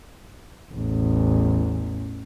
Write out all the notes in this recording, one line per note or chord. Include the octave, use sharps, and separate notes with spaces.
A1 E2